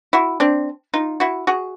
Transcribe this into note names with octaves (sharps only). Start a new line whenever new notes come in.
E4 F#4
C4 D4
D#4 F4
E4 F#4
F#4 G#4